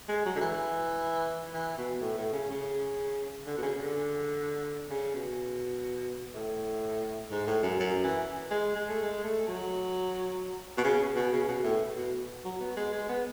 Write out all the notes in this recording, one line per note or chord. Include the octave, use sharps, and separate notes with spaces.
G#3
F#3
D3
E3
E3
B2
A2
A2
C#3
C#3
D3
B2
C#3
D3
C#3
B2
A2
G#2
A2
F#2
F#2
E3
G#3
G#3
A3
G#3
A3
F#3
B2
C#3
B2
C#3
B2
A2
B2
F#3
B3
G#3
G#3
B3